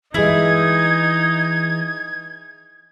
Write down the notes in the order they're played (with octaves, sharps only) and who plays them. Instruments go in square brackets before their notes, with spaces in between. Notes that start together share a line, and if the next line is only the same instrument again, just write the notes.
[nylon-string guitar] E3 G#3 [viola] D#4 [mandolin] E4 G#4 [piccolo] G#6